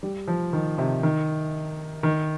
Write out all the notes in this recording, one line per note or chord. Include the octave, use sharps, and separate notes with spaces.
G3
F3
D#3
C3
D#3
D#3